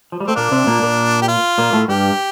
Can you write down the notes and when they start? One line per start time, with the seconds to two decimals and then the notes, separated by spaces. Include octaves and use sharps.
0.12 F3
0.20 G3
0.27 A3 C4
0.36 A#2 A#3 D4
0.52 C3 C4
0.67 A#2 A#3
0.82 A#2 A#3
1.21 G4
1.28 F4
1.58 A#2 A#3
1.73 A2 A3
1.88 G2 G3 G4